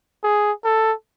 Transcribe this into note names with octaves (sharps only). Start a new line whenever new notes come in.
G#4
A4